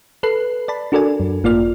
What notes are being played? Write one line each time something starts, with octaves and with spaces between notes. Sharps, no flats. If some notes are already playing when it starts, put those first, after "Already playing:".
A4 B4 F#6 C7
D5 A5 B5
D4 F#4 A4 A#4 D5 G#5
F#2
G#1 A#3 F4 D5 F6